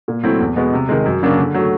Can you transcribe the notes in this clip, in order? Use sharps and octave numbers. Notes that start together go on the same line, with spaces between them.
A#2
F#3 A3 C4 E4
E2
B2 G#3 B3
C3
D#3 G#3
F#2
C#3 F#3 A#3 D4
D3
F#3 A3